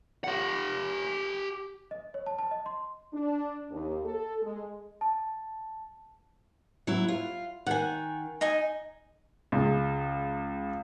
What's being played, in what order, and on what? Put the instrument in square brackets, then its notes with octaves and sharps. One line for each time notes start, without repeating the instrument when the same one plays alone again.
[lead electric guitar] G4 F#5
[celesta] D#5
C#5
A5
A5
D#5
C6
[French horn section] D4
D#2
A4
G#3
[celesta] A5
[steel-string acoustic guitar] F#3 E4
F4
[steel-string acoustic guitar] D#3 [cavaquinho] F#5 G#5
[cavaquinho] D#4 D#5 G#5
[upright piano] C#2 G#3